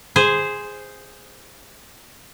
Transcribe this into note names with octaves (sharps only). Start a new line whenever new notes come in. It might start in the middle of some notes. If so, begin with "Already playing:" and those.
G#4 C5